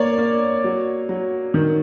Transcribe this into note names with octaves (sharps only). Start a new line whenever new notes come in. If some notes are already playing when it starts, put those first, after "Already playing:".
Already playing: A#3 C#5 D5
A#3
F#3
F#3
D#3